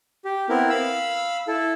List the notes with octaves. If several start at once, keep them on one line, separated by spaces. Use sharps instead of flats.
G4
B3 C4 E4 A#4
F5 B5 E6
E4 A4